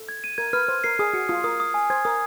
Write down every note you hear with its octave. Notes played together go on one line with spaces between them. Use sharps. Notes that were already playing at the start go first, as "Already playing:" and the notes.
Already playing: A4
G#6
D#7
A#4 G#6
B4 F6
C5 F6
A#4 C7
G#4 D#6
F#4 C#7
F4 D#6
A#4 D#6
D#6
G#5
C5 G#6
A#4 D#6